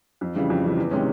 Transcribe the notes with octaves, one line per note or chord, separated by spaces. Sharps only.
F2
C#3 E3 G3
F2
C#3 E3 G3
E2
C3 D#3 G#3 C#4